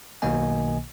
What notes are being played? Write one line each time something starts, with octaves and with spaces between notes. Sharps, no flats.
B1 B2 D#3 A#3 D#5 G#5